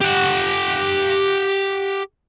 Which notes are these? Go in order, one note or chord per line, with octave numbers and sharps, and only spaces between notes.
G4 F#5